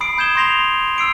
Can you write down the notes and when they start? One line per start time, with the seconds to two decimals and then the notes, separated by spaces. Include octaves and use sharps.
0.01 B5 D#6 C7 D7
0.18 B5 G6 G#6 E7 G7
0.36 C6 G6 A#6 C7 F7 G7
0.98 E6 C7 D7